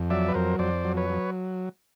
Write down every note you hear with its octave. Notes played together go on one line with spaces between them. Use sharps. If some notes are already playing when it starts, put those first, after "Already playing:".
Already playing: F2
F#3 D5 E5
B4
F2 A#4 C5
F2 C5 D5
F#3
B4 C#5
F#3